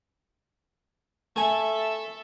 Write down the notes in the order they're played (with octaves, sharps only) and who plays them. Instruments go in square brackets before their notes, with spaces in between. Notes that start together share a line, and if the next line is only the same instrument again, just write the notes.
[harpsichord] A3 G#5 [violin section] A4 E5